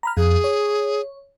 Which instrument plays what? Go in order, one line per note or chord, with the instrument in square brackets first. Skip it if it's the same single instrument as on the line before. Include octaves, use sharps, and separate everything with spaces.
[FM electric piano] A#5 B5 F6
[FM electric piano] F2 [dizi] G#4
[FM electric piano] C#5